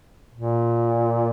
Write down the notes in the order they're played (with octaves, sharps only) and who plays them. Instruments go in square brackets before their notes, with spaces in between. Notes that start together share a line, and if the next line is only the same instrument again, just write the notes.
[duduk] A#2